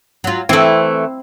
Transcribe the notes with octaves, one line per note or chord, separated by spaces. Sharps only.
F#3 F4
E3 A3 C4 E4